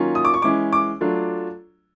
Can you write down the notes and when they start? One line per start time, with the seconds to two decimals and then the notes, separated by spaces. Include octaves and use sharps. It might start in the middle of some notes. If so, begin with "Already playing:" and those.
Already playing: D#3 F#3 A#3 C#4 F4
0.15 D#6
0.25 D6
0.34 C#6
0.42 E3 G#3 C#4 E4 D6
0.73 D6
1.01 F#3 A3 D4 F4